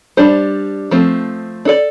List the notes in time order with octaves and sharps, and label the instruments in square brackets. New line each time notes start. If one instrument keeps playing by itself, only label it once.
[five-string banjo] G3 D4 G4 C5
F3 A3 C4
D4 A4 D5